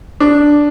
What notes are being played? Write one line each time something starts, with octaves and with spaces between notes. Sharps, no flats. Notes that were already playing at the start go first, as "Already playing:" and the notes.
D4